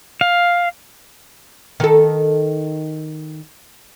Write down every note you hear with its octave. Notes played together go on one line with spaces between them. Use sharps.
F5
D#3 A4